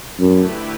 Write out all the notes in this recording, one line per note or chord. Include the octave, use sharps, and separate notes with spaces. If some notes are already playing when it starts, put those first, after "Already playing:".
F#2 D3 A3 E4 G4 B4